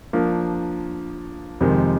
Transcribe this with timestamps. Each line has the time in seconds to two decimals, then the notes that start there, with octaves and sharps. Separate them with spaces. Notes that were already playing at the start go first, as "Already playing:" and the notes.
0.13 F3 A#3 D4
1.61 F2 C3 D#3 G#3